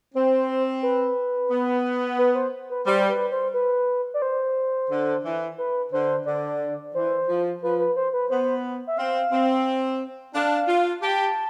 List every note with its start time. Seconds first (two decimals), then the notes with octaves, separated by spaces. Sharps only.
0.14 C4 C5
0.83 B4
1.51 B3
2.18 B4
2.35 C5
2.70 B4
2.86 G3 C5
3.10 B4
3.31 C5
3.54 B4
4.14 D5
4.22 C5
4.90 D3
5.24 E3
5.58 B4
5.92 D3 C5
6.26 D3 D5
6.94 E3 C5
7.28 F3
7.62 F3 B4
7.79 B4
7.96 C5
8.13 B4
8.30 B3 C5
8.87 E5
8.98 C4 F5
9.32 C4
10.34 D4 F5
10.68 F4
11.02 G4 A5